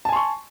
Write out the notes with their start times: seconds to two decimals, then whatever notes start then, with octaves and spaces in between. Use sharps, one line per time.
0.05 A5
0.09 G#5
0.12 C6
0.16 C#6